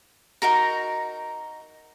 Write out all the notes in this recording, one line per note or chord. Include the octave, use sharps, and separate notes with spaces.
D#4 F#4 A#4 A#5